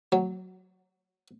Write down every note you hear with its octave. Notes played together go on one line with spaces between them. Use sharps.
F#3